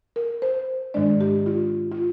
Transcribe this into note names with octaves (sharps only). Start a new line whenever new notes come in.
A#4
C5
G#2 D#3 G#3 D4 D5
G4
F4
F4